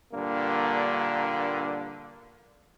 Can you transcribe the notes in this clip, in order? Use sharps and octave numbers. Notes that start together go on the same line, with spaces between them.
G2 A#2 D3 A#3